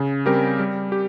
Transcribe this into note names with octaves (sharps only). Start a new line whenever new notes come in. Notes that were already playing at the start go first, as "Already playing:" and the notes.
Already playing: C#3
G3 C4 G4 A#4
G3
G4